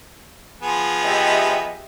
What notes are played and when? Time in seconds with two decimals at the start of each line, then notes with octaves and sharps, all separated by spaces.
0.62 F3 B3 G#4
1.05 G4 D#5 E5